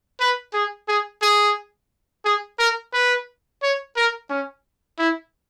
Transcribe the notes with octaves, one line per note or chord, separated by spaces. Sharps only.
B4
G#4
G#4
G#4
G#4
A#4
B4
C#5
A#4
C#4
E4